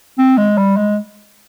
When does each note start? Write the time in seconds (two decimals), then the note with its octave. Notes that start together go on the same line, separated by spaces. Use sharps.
0.18 C4
0.38 G#3
0.57 G3
0.77 G#3